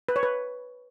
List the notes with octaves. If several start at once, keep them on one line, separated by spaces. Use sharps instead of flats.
B4
C#5
B4